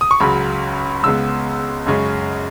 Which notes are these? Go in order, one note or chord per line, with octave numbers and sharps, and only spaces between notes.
D#6
C#6
C#2 C#3 F#3 B5
C#2 C#3 G#3 B3 E6
F#2 C#3 G#3 C#4